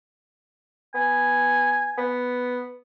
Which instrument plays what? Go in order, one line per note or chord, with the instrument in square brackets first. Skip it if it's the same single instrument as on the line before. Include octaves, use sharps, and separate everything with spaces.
[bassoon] B3 [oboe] G#5
[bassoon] B3